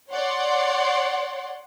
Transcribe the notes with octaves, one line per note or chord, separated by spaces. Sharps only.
C#5 D5 F#5 C6